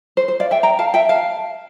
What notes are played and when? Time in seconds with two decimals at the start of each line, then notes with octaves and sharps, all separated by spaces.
0.17 C5
0.28 C5
0.40 D5 F5
0.51 E5 G5
0.63 G5 A#5
0.79 F5 A5
0.94 E5 G5
1.09 F5 A5